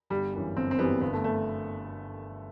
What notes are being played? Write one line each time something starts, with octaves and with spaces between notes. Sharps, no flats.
G1 G3
F#2 E3 G3
G1 C4
C4
F#2 E3 G3 B3
G1 B3
A3
A3